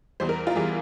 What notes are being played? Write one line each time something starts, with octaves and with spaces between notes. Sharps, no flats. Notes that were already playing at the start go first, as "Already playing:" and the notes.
E2 E3 G3 C5
A#4
F4
E3 G3 G#4